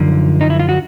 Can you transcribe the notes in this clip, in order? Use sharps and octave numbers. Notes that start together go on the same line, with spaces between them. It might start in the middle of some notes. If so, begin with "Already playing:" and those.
Already playing: F#2 D3 F3 D#4 F4
D#4
E4
F4
F#4